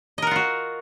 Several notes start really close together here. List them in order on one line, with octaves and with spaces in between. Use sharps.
D#5 A#4 F#5 F4 F#4